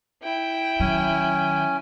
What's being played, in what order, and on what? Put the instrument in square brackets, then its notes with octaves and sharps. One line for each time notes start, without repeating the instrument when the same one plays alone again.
[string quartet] E4 G5
[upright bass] D#3 F#3 [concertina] C#4 G#5